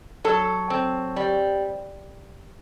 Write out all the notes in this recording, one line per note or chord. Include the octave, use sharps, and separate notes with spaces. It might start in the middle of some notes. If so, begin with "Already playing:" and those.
F#3 A4
C4
G3